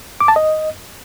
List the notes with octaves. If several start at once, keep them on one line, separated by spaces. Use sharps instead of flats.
D6
A5
D#5